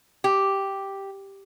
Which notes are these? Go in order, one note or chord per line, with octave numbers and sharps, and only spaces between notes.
G4